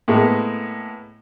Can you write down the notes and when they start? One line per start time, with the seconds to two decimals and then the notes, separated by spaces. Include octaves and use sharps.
0.08 A2 G#3 A#3 B3